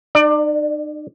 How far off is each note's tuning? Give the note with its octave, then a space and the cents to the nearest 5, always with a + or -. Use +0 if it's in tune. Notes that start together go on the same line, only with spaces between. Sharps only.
D#4 -40 D5 +25